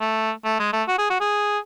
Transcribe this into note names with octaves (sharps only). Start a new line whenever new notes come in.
A3
A3
G#3
A3
F#4
G#4
F#4
G#4